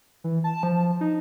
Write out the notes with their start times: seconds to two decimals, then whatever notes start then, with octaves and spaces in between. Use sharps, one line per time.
0.24 E3
0.44 A5
0.63 F3
1.01 D#4